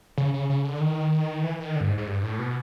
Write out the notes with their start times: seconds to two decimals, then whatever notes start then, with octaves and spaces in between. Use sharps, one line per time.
0.18 C#3
0.34 C#3
0.50 C#3
0.64 D3
0.80 D#3
1.44 E3
1.59 D#3
1.76 D3
1.81 G2
1.87 G#2
1.98 G#2
2.07 G2
2.23 A2
2.39 B2